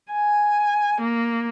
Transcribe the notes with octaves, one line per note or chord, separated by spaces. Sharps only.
G#5
A#3